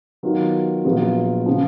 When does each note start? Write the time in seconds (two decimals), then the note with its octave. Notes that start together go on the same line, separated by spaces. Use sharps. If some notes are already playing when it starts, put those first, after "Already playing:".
0.23 D#3 F#3 B3 F4
0.85 A#1 A#2 F#3 B3 F4
1.46 C#3 F3